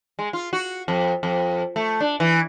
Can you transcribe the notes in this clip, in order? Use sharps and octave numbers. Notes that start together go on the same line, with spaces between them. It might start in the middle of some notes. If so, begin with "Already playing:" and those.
G#3
F4
F#4
F2
F2
A3
D4
E3